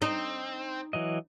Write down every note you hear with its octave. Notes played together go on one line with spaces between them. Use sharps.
C4 D#4
E3 F#3 D#5